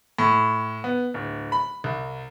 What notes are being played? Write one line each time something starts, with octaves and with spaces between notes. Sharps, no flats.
A2
B3
D1
B5
C2